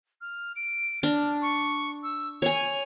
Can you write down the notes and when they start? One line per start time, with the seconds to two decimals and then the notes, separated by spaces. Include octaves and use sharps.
0.21 F6
0.56 D7
1.03 D4 F6
1.42 C#6
2.03 E6
2.42 C#5 G#5 F7